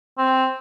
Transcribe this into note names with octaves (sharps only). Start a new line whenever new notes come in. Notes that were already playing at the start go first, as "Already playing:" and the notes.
C4